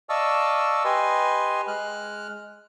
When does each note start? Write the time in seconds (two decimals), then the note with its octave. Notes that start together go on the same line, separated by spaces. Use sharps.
0.09 D5 D#5 F5 A5 C#6 E6
0.84 G4 B4 D#5 G#5 C6
1.68 G#3 F6 F#6